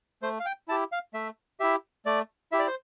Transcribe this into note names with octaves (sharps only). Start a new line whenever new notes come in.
A3 C5
F5
G5
E4 G4 A5
F5
A3 E5
E4 G4 E5
A3 D5
E4 G4 E5
D5
C5